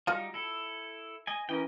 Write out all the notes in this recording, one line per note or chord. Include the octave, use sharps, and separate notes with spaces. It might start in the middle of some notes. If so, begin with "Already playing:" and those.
G3 D#4 F4 F#4
E4 A4
D#5 G#5
E3 C#4 A#4 D#5 G5